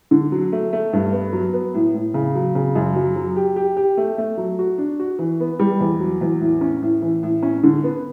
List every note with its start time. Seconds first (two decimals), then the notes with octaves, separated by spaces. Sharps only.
0.11 D3
0.32 F#3
0.52 A3
0.73 A3
0.93 G2
1.12 B3
1.33 F#3
1.53 B3
1.74 A2
1.95 A2
2.14 C#3
2.35 F#3
2.55 C#3
2.75 F#2
2.96 F#3
3.16 F#3
3.36 G4
3.56 G4
3.77 G4
3.97 A3
4.18 A3
4.37 F#3
4.59 F#4
4.78 D4
4.99 F#4
5.19 E3
5.40 B3
5.59 G3
5.81 E2
6.00 F#3
6.21 E2
6.41 A2
6.61 C#4
6.82 A2
7.02 E3
7.23 A2
7.43 C#4
7.63 D3
7.84 B3